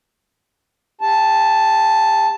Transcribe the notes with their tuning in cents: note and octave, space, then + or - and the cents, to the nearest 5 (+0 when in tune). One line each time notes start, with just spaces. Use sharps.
G4 +30 A5 +0